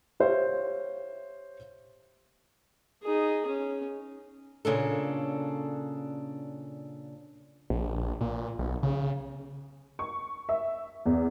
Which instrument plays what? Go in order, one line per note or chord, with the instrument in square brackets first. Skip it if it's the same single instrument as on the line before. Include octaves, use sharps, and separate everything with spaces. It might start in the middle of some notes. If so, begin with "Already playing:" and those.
[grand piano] G4 C5 C#5 E5 F5
[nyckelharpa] D#4 G#4
C#4
[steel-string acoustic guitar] A#2 C#3 D4 A4
[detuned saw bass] A#1
A#2
B1
C#3
[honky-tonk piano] C#6
E5
E2